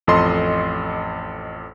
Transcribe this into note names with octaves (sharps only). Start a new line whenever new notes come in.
A1 F2 A4 D#5 C6